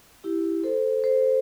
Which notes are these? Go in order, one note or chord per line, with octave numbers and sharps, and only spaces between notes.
E4 G4
A4 C5
A4 C5